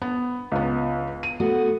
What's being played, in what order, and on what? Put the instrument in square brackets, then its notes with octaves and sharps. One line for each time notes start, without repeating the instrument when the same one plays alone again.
[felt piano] B3
C#2 B3
D#7
[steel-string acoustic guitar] A3 B3 F#4